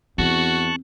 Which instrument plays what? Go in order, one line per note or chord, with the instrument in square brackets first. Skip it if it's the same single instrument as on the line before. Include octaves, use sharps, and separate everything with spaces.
[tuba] E2 [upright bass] C4 [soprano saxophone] F#4 [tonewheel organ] A5 C#6 F#6